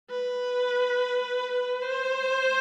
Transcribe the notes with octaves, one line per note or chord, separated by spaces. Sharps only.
B4
B4
C5